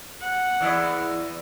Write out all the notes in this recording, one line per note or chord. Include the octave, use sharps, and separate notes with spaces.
F#5
E2 E4 D#5